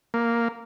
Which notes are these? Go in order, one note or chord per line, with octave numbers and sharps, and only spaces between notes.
A#3